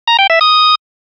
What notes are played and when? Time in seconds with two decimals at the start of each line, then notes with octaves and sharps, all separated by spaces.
0.07 A#5
0.19 G5
0.30 E5
0.41 D#6